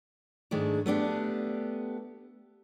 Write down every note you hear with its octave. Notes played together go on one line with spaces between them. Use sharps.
G#2 D#3 G#3 A3 D4
A3 B3 D4 G4